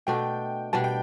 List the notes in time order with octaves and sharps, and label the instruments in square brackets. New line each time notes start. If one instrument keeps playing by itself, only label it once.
[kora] B2 A3 D4 [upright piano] G5
[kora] B2 G3 D4 [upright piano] A5
[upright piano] G5